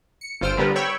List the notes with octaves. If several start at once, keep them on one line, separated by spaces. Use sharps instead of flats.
C#7
G1 F4 C5 E6 F6 D7
D3 G3 B3 A#4 B4
C#5 G5 B5 C#6 E6